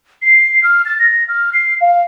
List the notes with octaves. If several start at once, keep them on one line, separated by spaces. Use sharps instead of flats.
C7
F6
A6
A#6
F6
C7
F5